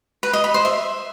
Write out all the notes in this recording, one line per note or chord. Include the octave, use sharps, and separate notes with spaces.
B4
D#5
B5
C5
E5